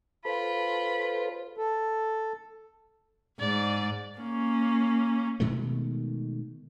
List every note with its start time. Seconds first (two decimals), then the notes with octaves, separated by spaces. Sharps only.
0.25 F4 A4 B4 C5 B5
1.57 A4
3.40 G#2 D5
4.19 A#3 C#4
5.40 B2 D#3 G#3 A3